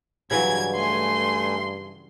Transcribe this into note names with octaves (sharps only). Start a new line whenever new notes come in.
G2 C#3 E3 F#3 G#6
A3 G#5 C6